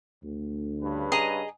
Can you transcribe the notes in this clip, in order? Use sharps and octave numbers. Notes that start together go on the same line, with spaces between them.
D2
G2 C#3 B4
G#4 D#5 A#5